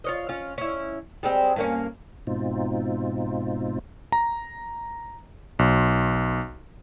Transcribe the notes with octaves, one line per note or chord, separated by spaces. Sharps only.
F4 C#5 D#5
C#4 F4
C#4 E4
G3 G#3 C4
G2 A#3 C#4
G#2 B2 C4 D#4 F4
A#5
B1